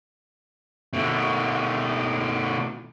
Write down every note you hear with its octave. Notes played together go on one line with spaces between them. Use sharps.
B2 A3